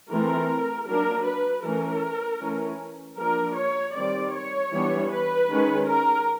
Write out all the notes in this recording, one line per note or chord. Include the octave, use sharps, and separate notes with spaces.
E3 A3 C4 A#4
F#3 A#3 D4 A#4
B4
E3 A3 C#4 A#4
E3 A3 C#4
F3 A#3 D4 A#4
C#5
D#3 G3 C4 D5
C#5
E3 G3 B3 D4
B4
D#3 G#3 C#4
A#4